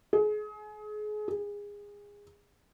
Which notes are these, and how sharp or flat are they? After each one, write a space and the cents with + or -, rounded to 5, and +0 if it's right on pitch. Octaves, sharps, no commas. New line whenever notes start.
G#4 +30
G#4 -25